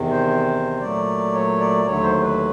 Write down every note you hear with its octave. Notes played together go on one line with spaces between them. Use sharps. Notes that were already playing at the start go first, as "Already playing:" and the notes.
Already playing: E2 C3 D#3
C5
A#2 F#3 A3 D5
C#5
D5
D#2 D3 F#3 A3 C#5
C5
B4